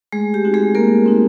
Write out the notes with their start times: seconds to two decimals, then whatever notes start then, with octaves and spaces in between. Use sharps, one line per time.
0.12 G#3 A3 G#4
0.34 G4
0.44 C4 D#4 F#4
0.54 G#3 G#4
0.75 A3 A#3 A#4
1.06 C4 D#4 F#4